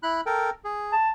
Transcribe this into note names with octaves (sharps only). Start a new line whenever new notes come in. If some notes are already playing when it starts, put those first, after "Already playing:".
E4 B5 F#6
A4 A#4 G5
G#4
A5